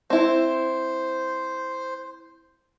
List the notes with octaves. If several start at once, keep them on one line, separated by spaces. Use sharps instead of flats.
C4 E4 C5